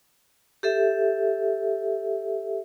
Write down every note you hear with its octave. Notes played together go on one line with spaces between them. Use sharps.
G4 A4 E5